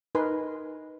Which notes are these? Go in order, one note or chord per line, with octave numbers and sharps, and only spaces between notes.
D#4 A#4 B4 G#5 C6